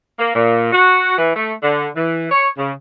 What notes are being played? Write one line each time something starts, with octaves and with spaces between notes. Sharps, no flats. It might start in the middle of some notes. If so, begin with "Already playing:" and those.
A#3
A#2
F#4
E3
A3
D3
E3
C#5
C#3